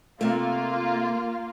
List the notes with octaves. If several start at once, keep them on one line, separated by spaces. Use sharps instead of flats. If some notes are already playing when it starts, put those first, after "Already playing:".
C3 A3 A#3 F4